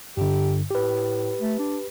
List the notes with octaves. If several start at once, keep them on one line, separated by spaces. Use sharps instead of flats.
G2 D3 G4
A2 G4 B4
A3
D4